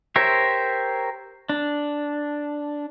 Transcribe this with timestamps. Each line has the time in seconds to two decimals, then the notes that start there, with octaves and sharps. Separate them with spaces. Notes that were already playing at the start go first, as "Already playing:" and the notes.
0.16 G4 A#4 C5 C#5 E5
1.49 D4